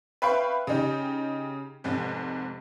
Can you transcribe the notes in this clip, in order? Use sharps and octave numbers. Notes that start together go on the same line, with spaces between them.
B4 E5 F5 G5 B5 C#6
C#3 D#4 G4
F1 G#2 C3